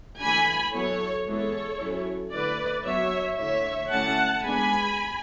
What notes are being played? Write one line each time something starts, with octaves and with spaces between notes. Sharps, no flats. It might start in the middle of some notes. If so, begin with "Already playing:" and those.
E3 A3 D4 G#5 B5
F#3 B3 E4 A4 C#5
E3 G#3 B3 E4 A4 C#5
F#3 C#4 E4
D3 A3 E4 B4 D5
F#3 B3 D4 C#5 E5
D3 A3 E4 C#5 E5
D3 A3 C#4 E4 F#5 A5
G#3 B3 D4 G#5 B5